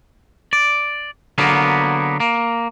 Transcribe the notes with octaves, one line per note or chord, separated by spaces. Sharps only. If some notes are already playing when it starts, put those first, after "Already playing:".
D5
D3 F#3 A#3 B3
A#3